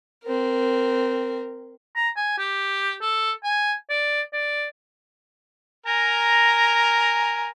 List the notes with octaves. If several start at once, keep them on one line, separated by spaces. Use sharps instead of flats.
C4 A#4
A#5
G#5
G4
A4
G#5
D5
D5
A#4 G#5 A#5